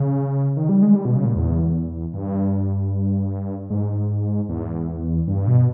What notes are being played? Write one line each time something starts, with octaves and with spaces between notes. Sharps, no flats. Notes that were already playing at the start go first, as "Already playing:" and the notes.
Already playing: C#3
D#3
G3
G#3
G3
B2
C#3
A#2
E2
G2
G#2
E2
G2
B2